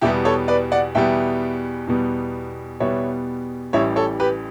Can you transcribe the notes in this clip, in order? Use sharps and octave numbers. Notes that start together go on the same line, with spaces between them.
E2 B2 G3 B3 E4 G4
A4 C#5
B4 D5
D5 F#5
E2 B2 G3 B3 E5 G5
E2 B2 G3 B3
E2 B2 G3 B3 C#5 E5
A1 A2 E3 G3 C#5 E5
A4 C#5
G4 B4